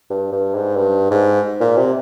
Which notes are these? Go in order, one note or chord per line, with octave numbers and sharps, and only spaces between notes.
G2
G2
G#2
G2
G#2
A#2
C3